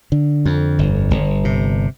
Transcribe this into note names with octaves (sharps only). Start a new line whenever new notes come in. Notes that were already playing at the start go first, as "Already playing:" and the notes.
D3
F2
G1
G1
C3